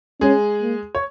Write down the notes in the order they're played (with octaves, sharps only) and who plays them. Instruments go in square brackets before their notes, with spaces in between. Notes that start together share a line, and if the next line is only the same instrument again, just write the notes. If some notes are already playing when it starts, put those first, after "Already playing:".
[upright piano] G#3 G#4 [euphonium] C#4
[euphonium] A#3
[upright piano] C#5